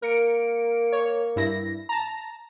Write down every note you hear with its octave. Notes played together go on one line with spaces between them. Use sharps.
A#3 A#4 C#7 D7
C#5
G2 E4 A#6
A5 A#5